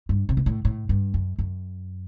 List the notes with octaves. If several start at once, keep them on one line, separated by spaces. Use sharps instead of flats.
G2
C3
B2
A2
A2
G2
F#2
F#2